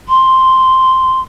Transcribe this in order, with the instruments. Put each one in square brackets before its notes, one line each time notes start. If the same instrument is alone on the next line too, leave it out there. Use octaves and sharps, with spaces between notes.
[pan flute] C6